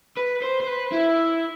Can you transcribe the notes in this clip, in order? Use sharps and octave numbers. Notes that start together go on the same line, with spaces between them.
B4
C5
C5
B4
E4